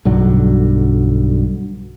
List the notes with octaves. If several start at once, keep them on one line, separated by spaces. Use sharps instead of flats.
B1 G2 D3 F#3